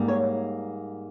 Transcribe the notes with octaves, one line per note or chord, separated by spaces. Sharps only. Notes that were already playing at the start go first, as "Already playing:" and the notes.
Already playing: G#2 G3 A#3
C#5